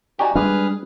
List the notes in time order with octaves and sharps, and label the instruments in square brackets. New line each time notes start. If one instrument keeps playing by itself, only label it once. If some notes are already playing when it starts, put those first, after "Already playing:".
[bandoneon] D#4 F#4 [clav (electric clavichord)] G4 D5 G#5
[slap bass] G3 G#3 D4 [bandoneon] G#4 B4 F6